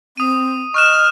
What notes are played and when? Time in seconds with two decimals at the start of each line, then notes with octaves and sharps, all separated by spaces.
0.17 C4 D#6 D#7
0.74 D#5 C#6 F6 F#6 E7